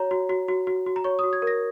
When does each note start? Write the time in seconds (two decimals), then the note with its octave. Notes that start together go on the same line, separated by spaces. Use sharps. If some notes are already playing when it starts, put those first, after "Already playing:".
Already playing: F#4 C#5 A#5
0.11 F#4
0.29 F#4
0.48 F#4
0.67 F#4
0.86 F#4
0.96 A#5
1.04 C#5 C#6
1.19 D#6
1.24 F#4
1.33 G#6
1.42 A#4
1.47 A#6